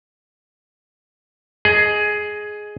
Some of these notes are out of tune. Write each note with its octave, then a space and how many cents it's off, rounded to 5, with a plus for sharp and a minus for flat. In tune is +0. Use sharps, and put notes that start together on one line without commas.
G#4 +10 D#5 +0